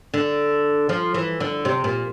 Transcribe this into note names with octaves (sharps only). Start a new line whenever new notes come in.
D3
F3
E3
D3
C3
A#2